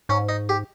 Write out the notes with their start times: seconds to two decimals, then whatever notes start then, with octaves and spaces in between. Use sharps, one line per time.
0.09 G#2 C#4
0.29 D#4
0.49 G4